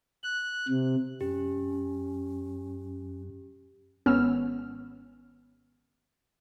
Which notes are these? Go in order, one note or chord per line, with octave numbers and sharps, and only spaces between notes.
F#6
C3
F#2 C#4 G4
G#1 B3 C#4 E6 F6